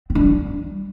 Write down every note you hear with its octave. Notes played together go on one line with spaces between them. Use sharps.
C4
D4
G3